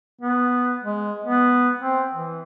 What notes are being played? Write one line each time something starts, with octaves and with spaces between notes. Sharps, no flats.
B3
G#3
B3
C4
E3